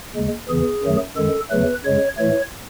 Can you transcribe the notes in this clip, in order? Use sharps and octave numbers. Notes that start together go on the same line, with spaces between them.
D#2 C#3 G#3
E2 C#3 E3 G#4
F#2 D#3 F#3 A3
F#2 D#3 G#3 A4
E2 C#3 F#3 A3 B4
F#2 C#3 G#3 C#5
A2 E3 A3 C#5